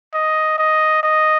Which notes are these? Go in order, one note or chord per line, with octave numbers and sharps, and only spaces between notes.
D#5
D#5
D#5